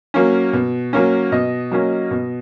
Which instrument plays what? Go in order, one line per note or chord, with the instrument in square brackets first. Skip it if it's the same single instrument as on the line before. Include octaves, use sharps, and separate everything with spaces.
[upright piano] F#3 A#3 C#4
B2
F#3 A#3 C#4
B2 D#5
F#3 A#3 C#4
B2